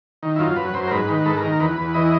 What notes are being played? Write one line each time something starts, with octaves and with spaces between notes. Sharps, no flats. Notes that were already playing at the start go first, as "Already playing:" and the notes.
D#3
E4
F#2 F4
F#2 B4
F#2 C5
A#4
G#2 B4
D#3
B4
G#2 A4
A#4
D#3
E2 B4
E2
E3 D#5